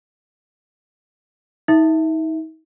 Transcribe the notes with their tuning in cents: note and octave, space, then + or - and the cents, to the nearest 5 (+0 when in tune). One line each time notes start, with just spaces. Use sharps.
D#4 +40 E5 +0